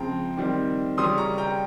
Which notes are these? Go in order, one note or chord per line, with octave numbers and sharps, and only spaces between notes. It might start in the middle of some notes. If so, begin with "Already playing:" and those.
Already playing: C#3 F3 G#3 C4 G5 A#5
D#3 G3 C4
C#3 G3 C#4 C6 D#6
A#5 C#6
G5 A#5